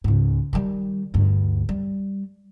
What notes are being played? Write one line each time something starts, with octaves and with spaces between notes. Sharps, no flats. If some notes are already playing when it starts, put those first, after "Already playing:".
C#2 G#2
D#3 G3
D2 G2
G3